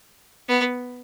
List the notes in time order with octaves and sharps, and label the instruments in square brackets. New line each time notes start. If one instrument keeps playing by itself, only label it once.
[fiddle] B3